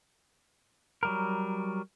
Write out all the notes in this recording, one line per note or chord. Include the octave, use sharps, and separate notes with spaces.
F#3 G3 A#4